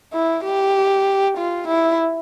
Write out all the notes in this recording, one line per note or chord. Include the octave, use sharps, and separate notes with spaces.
E4
G4
F4
E4